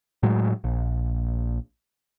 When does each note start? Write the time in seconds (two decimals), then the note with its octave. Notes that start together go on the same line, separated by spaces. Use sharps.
0.23 A2 F#3 G#3
0.64 A#1